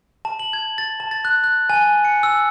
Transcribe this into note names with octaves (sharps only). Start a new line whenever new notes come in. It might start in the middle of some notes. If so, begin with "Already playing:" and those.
A5
F#7
G#6
A6
A5
A6
F#6
F#6
G#5
C#7
E6